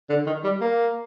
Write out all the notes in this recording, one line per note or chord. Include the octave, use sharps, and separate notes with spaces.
D3
D#3
G3
A#3